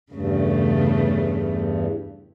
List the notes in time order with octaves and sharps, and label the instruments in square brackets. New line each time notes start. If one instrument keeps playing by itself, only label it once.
[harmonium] E2 G2 [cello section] C#3 A3